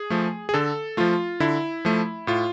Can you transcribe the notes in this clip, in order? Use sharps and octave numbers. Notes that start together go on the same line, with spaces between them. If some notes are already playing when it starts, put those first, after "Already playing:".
Already playing: G#4
F3 A3
G#4
D3 A4
F3 A3 F4
D3 E4
F3 A3
A2 F4